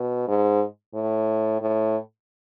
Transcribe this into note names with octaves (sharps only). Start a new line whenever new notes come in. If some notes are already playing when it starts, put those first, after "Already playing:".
Already playing: B2
G#2
A2
A2